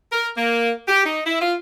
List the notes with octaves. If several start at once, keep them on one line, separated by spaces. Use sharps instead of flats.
A#4
A#3
G4
D#4
E4
F4